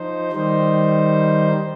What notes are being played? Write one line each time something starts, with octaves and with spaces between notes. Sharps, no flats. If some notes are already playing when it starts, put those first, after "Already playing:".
Already playing: F3 D#4 C5
D#3 G3 D#4 C5